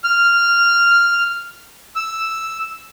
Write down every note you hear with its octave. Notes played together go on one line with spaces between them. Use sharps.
F6
E6